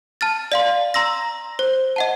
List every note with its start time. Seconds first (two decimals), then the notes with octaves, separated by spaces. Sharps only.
0.21 A5 F6 A6
0.52 D5 F5 C6
0.94 A#5 C6 E6 A#6
1.59 C5
1.96 D#5 F#5 A5